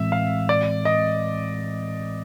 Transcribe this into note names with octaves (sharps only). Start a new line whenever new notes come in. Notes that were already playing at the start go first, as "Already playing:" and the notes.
Already playing: A2 E3 G#3 C4 E5
F5
D5
D#5